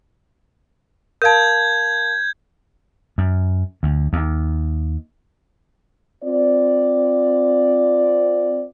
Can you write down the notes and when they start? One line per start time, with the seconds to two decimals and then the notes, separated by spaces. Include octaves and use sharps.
1.22 A#4 F5 A5 G6 G#6
3.18 F#2
3.83 D2
4.13 D#2
6.23 C4 F4 D5